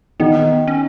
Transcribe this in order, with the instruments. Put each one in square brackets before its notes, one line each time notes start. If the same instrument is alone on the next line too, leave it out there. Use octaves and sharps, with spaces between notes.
[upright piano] D#3 D#4 [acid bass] B3
[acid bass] C#4